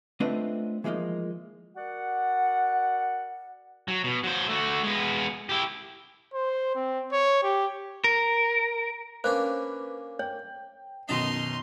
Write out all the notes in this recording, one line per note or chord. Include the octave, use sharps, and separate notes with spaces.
A3 C4 D4 F4 B4 D#5
E3 F3 G#3 A#3 D#4
F#4 A#4 D5 F#5
F#3
B2
F#3 C5
A3 F#4
G#3 B3
E4 G4
C5
C4
C#5
G4
A#4
A#3 C#4 D4 B4 C5
C#5 G5
F#2 B2 D#3 D#4 D#5 A5 A#5 C6